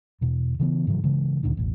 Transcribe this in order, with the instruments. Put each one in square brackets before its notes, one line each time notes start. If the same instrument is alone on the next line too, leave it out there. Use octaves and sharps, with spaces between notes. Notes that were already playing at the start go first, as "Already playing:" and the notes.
[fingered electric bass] E2 B2
C#3 E3 B3
G#2 C#3 E3 F#3
C#3 E3 G#3
D2 A#2 D3 D#3
E1 A1